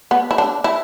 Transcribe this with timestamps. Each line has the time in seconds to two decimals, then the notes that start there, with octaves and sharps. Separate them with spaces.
0.11 B3
0.31 E4
0.38 D4
0.64 E4